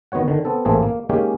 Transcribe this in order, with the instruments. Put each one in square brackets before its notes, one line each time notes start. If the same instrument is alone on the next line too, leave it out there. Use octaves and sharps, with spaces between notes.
[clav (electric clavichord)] D#3 B3 F#4 C#5 F#5
D3 D#3
B3 C4 A4
A1 E3 A#3 C4 G#4 A4
A#3
G#3 A#3 C#4 D#4 G4 G#4